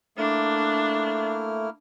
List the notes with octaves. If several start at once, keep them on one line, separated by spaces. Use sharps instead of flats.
A3 A#3 D4 E4 F6